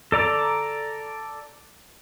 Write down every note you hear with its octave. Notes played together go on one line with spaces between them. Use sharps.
A4 D5 A#5 D6